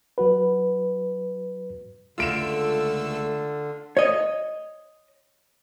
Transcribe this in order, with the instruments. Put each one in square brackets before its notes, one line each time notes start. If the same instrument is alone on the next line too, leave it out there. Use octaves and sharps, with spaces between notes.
[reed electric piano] F#3 F#4 B4
[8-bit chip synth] C#2 A3 E6 [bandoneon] D3 [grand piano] F4 D7 E7
[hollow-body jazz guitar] C#5 D#5